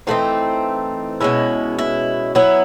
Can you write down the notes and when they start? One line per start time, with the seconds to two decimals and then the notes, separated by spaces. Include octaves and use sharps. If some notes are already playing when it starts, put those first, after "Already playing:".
0.07 E3 A3 C4 D#4 F4
1.21 B2 G#3 C#4 E4
1.79 E4
2.35 F#3 B3 E4